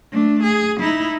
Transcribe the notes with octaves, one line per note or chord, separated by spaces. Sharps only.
A3 D4
G#4
D#4 E4